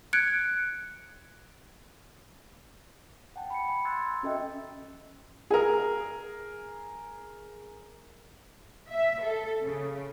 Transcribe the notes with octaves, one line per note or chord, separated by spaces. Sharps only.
F#6 G#6 C#7 D7
F#5 G5 A5
B5 C#7
G#5 B5
A#5 C6 E6 F#6 G#6 A6
E6
C#4 F#4 A4 D#5 E5 G5
G#4 A#4
E5
A4
C#3